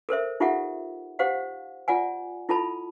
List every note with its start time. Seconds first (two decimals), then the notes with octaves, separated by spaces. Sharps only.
0.09 A4 A#4 C5 E5
0.40 D#4 F4 G4 A4 E5 F#5
1.19 G4 C5 F5 F#5
1.88 F4 D5 F#5 G#5
2.49 E4 F4 A4 A5 B5